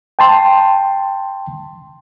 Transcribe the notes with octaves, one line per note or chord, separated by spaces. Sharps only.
G5 A5 C6